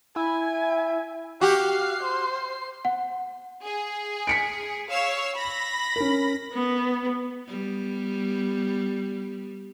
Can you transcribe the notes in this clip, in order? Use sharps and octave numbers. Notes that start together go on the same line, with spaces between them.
E4 G#5
F#4 G4 F5 C7
C5
F#5
G#4
B6 C#7 D7
C#5 F5 E6
B5 A#6
C#4 A#4
B3
G3 B3